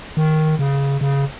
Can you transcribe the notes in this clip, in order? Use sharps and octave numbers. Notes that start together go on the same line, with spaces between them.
D#3
C#3
C#3